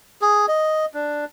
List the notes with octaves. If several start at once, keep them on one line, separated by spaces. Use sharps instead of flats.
G#4
D#5
D4